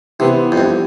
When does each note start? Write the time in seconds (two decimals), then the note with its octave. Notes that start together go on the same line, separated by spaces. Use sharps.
0.19 C3 E3 B3 E4
0.52 F2
0.58 G2